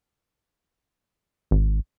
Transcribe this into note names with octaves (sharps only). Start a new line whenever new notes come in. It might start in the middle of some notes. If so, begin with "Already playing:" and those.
G#1